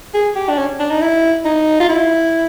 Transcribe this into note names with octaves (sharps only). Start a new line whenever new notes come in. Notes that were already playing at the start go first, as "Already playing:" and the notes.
G#4
G4
D4
C#4
D4
D#4
E4
D#4
F4
E4